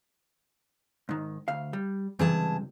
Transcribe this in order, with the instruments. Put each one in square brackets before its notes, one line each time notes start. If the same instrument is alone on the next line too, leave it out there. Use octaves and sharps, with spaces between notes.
[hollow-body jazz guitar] G#2 D#3
D2 F5
G3
[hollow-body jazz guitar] C#2 G2 C3 [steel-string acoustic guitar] E3 G#4 A5